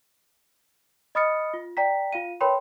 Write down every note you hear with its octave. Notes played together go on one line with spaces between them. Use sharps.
D#5 B5 D#6 F6 A6 C#7
F4
D5 G5 A#5 B6
F4 F5 D#7
A#4 B4 C#5 G5 B5 C6